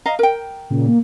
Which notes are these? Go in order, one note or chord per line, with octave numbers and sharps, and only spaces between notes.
D#5 F5 A#5
A#4 G5
A#2 C#3
A#3